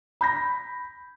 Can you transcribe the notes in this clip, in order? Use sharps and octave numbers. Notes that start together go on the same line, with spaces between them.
B5 G6 A#6